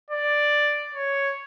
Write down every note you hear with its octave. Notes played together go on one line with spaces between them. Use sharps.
D5
C#5